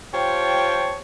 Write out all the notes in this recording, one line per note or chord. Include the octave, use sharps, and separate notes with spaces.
F4 G4 C5 C#5 G5 A5